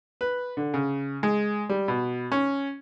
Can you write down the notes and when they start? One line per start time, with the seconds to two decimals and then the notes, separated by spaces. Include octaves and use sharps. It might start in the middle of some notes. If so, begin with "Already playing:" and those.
0.21 B4
0.57 D3
0.74 C#3
1.23 G#3
1.69 G3
1.88 B2
2.32 C#4